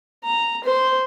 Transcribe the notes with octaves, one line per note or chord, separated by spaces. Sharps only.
A#5
C5